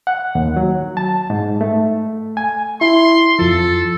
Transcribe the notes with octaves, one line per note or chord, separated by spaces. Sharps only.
F#5
D#2
F#3
A5
G#2
A3
G#5
E4 C6
F2 F3 A4